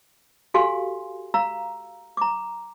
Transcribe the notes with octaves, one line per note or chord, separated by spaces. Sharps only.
F#4 G4 A4 F5 G#5 C6
F5 A#5 E6
A#5 D6